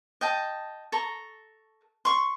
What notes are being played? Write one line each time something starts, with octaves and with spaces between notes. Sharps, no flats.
D#5 G5 A5
A4 A#5 C#6
C6 C#6